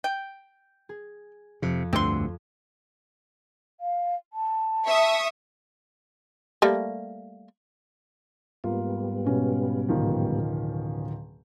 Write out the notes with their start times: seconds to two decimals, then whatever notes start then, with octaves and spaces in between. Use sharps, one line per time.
0.04 G5
0.89 G#4
1.62 F2 C3 C#7
1.93 D2 G2 D3 C4 C6 A#6
3.80 F5
4.33 A5
4.87 E5 C#6 D#6
6.62 G3 A3 A#3
8.64 G#2 G3 A#3 B3 F4
9.25 B2 C#4
9.89 D1 D#3 F3